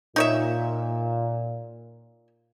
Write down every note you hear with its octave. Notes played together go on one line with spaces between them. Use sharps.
A#2 D#4 C#5 E5